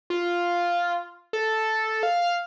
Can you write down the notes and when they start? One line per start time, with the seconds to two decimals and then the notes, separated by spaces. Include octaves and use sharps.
0.10 F4
1.33 A4
2.03 F5